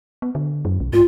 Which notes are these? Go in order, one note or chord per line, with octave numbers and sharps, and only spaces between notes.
B3
D3
F#2
B1
G#2 F4